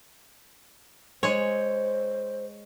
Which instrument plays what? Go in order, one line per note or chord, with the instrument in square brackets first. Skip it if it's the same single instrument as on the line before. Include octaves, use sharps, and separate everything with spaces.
[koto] G#3 C#5 [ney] C5